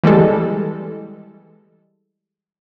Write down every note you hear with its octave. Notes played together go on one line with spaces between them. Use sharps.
E3 G3 G#3 A4